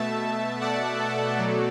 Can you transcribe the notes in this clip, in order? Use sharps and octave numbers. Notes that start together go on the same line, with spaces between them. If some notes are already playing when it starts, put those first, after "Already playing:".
Already playing: B2 A3 E5 A5
D5 F#5
A4 D5
B2 F#3 A3